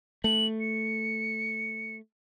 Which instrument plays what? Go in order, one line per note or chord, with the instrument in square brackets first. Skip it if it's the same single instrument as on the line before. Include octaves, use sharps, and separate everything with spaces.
[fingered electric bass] A3 [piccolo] F#7
[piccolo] C#7